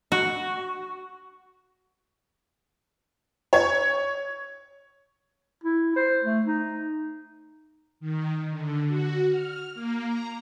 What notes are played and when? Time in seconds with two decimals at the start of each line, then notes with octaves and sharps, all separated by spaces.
0.12 F#4
3.53 C#5 G#6
5.64 E4
5.96 C5
6.25 A3
6.46 D#4
8.00 D#3
8.50 D3
8.87 F#4
9.29 F6
9.74 A#3
10.06 A#5